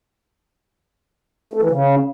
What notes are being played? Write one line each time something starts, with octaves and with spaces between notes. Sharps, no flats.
A3
E3
C#3